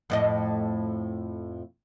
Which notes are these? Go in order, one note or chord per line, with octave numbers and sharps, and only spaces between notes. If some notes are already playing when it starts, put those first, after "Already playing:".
F2 A2 D#5